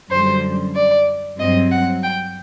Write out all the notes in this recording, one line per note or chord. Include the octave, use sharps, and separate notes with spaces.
F#2 D3 G3 C5
D5
G2 F#3 C4 D#5
F#5
G5